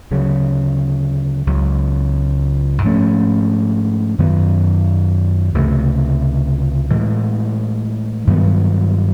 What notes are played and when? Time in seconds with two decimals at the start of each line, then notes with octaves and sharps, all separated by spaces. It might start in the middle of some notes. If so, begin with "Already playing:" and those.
0.11 D2 C#3 F#3
1.47 C#2 C#3 F#3
2.82 G#2 F3 A3 C#4
4.18 F#2 D#3 F#3 B3
5.54 C#2 C3 E3 A3
6.90 A2 E3 G#3
8.27 G2 D#3 F#3 B3